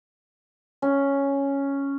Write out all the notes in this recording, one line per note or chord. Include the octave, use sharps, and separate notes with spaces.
C#4